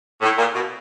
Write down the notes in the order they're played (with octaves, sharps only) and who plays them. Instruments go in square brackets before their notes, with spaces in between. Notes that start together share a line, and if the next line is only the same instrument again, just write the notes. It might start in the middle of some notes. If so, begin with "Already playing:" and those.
[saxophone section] A2
A#2
B2